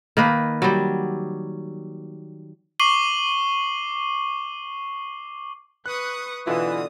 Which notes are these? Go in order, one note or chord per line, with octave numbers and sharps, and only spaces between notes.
D#3 A#3 B4
F#3 G3
C#6 D6 C7 D#7 F#7 G7
B4 C#6 D#6 F#6
B2 D3 E3 F4 D#6 E7